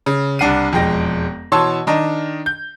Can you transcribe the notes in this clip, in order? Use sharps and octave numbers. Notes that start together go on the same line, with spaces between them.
C#3
C2 D4 F#5 C7 D#7
E1 F2 G#3 G5 A#6
B2 E3 C#5 A5 C6 E6
D#3 D4 D#5 A#5
G6